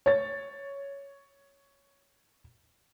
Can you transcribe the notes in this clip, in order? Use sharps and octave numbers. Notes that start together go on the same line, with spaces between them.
C#5 A6